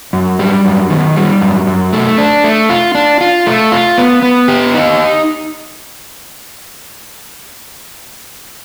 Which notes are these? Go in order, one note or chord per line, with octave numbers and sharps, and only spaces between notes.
F#2
G3
F#2
D#3
G3
F#2
F#2
A3
D4
A3
F4
D4
F4
A3
F4
B3
B3
G4
D#4